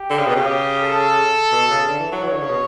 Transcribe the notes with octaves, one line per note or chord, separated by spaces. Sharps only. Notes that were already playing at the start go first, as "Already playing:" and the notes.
Already playing: G4
D3
C#3
B2
C#3
G4
A4
B2
C#3
D3
E3
F#3
E3 C#5
D3
C#3
B2